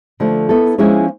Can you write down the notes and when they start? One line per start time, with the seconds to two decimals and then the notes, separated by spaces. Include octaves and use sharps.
0.20 D3 F3 A3
0.49 B3 E4 A4
0.78 F3 G#3 C#4 E4 G#4